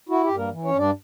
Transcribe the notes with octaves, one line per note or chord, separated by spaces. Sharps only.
E4 F#4
G4
G2
A#3 A#4
E3
C#4 C#5
G2
D4 D5